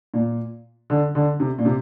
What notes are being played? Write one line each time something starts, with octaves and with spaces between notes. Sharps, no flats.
A#2
D3
D3
C3
A#2
C3